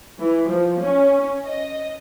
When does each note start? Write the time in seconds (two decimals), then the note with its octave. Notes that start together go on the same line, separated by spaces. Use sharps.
0.19 E3
0.47 F3
0.80 C#4
1.45 D#5